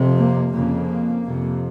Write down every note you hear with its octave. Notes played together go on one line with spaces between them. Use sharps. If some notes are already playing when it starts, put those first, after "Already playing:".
Already playing: F2 C3
A#3
F2 C#3 A#3
F2 C3